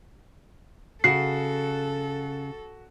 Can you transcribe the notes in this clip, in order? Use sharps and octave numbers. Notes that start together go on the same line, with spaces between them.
C#3 F#4 A4 F#5 C7